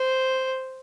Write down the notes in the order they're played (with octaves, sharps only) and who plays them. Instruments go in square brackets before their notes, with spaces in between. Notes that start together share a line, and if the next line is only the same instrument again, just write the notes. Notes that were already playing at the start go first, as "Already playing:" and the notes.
Already playing: [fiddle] C5